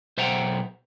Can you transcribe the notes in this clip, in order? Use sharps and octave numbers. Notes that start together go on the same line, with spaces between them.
B1 C5 E5 F#5 G5 A#5